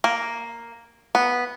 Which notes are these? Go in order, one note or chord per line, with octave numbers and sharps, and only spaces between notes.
A#3
B3